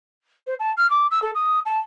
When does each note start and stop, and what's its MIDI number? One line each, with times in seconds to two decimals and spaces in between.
0.47 0.54 72
0.59 0.72 81
0.77 0.88 89
0.90 1.07 86
1.11 1.20 88
1.22 1.31 69
1.35 1.60 87
1.65 1.78 81